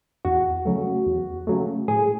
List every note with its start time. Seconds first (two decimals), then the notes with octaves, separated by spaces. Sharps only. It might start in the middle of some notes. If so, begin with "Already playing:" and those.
0.25 E2 F#4
0.65 C#3 F#3 A3
1.06 E2
1.47 C#3 F#3 A3
1.88 A2 G#4